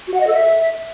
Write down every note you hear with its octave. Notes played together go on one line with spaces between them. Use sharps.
F#4
F#5
D#5
A4
E5